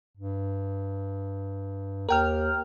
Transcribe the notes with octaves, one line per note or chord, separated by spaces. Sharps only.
G2
D#2 A#4 G5 F6